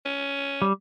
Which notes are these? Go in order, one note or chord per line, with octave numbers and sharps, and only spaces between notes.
C#4
G3